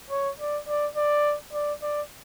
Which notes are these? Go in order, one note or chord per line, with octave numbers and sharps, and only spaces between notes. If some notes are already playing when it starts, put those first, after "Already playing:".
C#5
D5
D5
D5
D5
D5